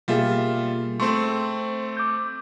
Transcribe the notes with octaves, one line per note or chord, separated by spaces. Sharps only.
B2 G3 A#3 F4 G#4 E5
A3 C4 C5 C6 C#6
D6 G6